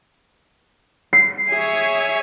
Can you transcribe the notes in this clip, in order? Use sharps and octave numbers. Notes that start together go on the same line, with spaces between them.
C7
G#4 C#5 E5